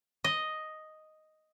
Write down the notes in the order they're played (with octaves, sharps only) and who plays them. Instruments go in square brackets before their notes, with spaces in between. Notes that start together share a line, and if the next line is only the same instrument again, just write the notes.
[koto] D#5